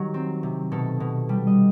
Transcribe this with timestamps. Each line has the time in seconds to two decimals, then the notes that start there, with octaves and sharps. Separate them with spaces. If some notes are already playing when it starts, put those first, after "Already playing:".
Already playing: D#3 F#3 G4
0.14 C4
0.43 C3
0.72 B2 A4
1.00 B2
1.29 G3
1.47 D#5